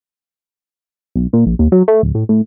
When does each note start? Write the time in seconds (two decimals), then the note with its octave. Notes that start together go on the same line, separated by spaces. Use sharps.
1.16 B1
1.33 A#2
1.46 A#1
1.59 D#2
1.72 F#3
1.88 A3
2.03 D1
2.15 A2
2.29 A2